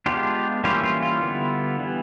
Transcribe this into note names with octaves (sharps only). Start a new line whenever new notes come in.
G#3 B3 D4 F4 G4
E3 G3 A#3 C#4 E4 F4 G4
F4
F4
D3 G3 B3 E4
E3 G3 B3